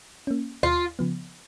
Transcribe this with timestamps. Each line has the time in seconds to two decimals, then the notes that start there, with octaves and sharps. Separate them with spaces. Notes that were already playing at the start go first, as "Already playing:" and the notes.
0.27 A#3 C#4
0.63 D#2 F4
0.99 C#3 F3 B3